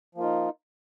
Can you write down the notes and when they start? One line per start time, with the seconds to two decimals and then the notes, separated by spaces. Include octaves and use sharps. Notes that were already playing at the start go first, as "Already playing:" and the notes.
0.15 F3
0.18 A#3
0.20 F4
0.23 D#4